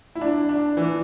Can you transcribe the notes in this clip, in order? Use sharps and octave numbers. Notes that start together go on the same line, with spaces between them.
E4
D4
D4
E3